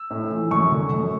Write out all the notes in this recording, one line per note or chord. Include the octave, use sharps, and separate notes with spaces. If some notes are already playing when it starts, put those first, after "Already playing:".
Already playing: E6
A2
E3
F#2 C#6
D3
F#2